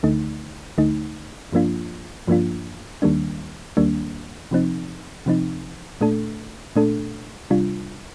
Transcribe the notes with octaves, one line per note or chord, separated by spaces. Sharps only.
D2 D3 A3 D#4
D2 D3 A3 D#4
G2 F3 A#3 D4 F4
G2 F3 A#3 D4 F4
D#2 D#3 G3 A#3 D4
D#2 D#3 G3 A#3 D4
C3 F3 C4 D#4
C3 F3 C4 D#4
A#2 A3 D4 A4
A#2 A3 D4 A4
C3 G3 D4 F4